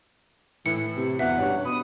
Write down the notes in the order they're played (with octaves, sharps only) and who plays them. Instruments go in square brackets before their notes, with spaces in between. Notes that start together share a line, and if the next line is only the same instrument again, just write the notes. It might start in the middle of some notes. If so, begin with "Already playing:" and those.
[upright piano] A2 [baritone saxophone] E3 [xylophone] C#7
[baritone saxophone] C3
[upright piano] G1 E2 [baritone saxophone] B2 [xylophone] E5 [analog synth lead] F#5
[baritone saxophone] G2 [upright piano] C#4 D4 C#5
[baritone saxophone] B2 [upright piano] B5 [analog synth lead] D#6